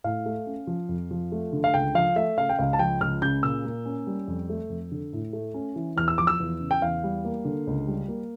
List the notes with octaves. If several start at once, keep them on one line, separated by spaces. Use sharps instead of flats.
A2 F5
A3
C#4
F3
F2
F3
A3
D3
F5
C#2 G5
F3 F5
A3 E5
C#3 F5
G5
C#2 F5
A5
F3 G5
C#2 F6
C#3 G6
A#2 E6
A#3
C#4
G3
F2
A3
F2
D3
A2
A3
C#4
E3
E2 F6
E6
F3 D6
E6
E2
C#3
G5
E2 F5
G3
A#3
D3
C#2
G3
A#3